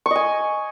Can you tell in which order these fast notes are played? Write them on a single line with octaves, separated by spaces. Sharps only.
C#6 D#5 G#5